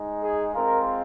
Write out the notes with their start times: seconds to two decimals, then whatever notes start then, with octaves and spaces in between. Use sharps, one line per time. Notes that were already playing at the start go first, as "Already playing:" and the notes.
Already playing: G#3 D#4
0.22 G#4
0.54 G#3 C4 F4 A#4